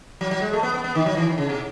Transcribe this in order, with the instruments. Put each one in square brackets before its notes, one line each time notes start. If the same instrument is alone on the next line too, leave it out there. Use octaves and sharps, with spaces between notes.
[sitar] F#3
F#3
G#3
A3
B3
B3
B3
D#3
F#3
E3
D#3
C#3
B2